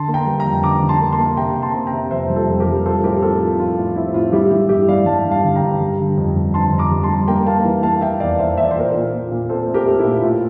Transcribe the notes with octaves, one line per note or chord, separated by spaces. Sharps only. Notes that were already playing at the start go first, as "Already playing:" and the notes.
Already playing: D3 A5 C6
A#3
G5 A#5
G3
G5 A#5
F2
D3 A#5 D6
D3
A5 C6
A#3
A5 C6
A#3
C3 G5 A#5
C3
A5 C6
C4
G5 A#5
C3
F2 C5 E5
G3
F4 A4
F2
G4 A#4
G3
F3 A4 C5
A2 G4 A#4
C4 F4 A4
F3
F3 F4
A2
C4 E4
A2 F4
G3 E4 G4
G3 E4 G4
G2 E4 G4
G3 D5 F5
G3 F5 A5
G2
F5 A5
D3
G5 A#5
G2
G3
D3
F2
G3
D3 A5 C6
F2
A#5 D6
G3
A5 C6
G3
A#3 G5 A#5
A#3 F5 A5
E3
A#3 F5 A5
E3 E5 G5
E2 D5 F5
E2 C5 E5
E2 E5
D5
C5
A#2 A#4 D5
A#2
A#2
A#2
C4 A4 C5
A3
G4 A#4
A3
E4
A#2
A2 F4